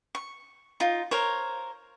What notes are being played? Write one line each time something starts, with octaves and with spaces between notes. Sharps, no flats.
C#6
D#4 F4
A#4 C5 C#5